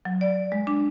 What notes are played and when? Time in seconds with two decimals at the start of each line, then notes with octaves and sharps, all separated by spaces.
0.05 F#3
0.21 D5
0.52 G#3
0.67 D4